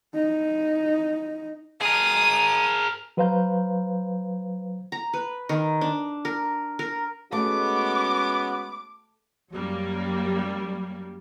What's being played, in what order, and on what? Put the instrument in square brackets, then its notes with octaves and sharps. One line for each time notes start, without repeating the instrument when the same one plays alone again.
[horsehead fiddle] D#4
[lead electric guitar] G#4 A#4 [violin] D#6
[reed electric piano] F#3 B4 C5 F5 A#5 G6
[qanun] A#5
B4
D#3
D4
A#4
A#4
[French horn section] G#3 C#4 F#4 [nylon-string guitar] A3 [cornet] B3 [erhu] D6
[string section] F#2 F#3 G3 A#3